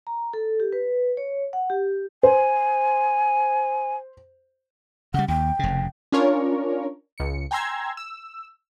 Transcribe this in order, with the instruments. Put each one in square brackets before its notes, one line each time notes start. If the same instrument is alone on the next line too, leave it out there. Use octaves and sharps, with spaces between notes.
[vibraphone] A#5
A4
G4
B4
C#5
F#5
G4
[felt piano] C5 [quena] G#5
[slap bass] C#3 G3 [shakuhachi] F#5
[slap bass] D#2 [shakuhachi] G5
[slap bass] F1 C#3
[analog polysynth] C#4 D4 F4 A#4 C#5
C#2 C#7
G5 G#5 A#5 C6 E6 G#6
E6